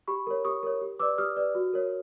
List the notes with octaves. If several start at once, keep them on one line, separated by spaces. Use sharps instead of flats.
G4 B5 C#6
A#4 C#5
G4 C#6 D#6
A#4 C#5
G4
B4 D5 D6 E6
G4 D#6 F6
B4 D5
F#4
A#4 C#5